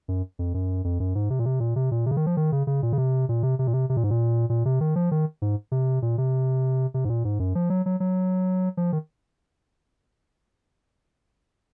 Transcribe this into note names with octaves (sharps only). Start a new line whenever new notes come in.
F#2
F2
F#2
F2
F#2
G#2
C3
A#2
C3
A#2
C3
A#2
C3
C#3
D#3
F3
D#3
C#3
C#3
A#2
C#3
C3
A#2
C3
C3
A#2
C3
C3
A#2
G#2
A#2
A#2
C3
D#3
F3
D#3
G#2
C3
A#2
C3
C3
G#2
A#2
G#2
F#2
F3
F#3
F#3
F#3
F3
D#3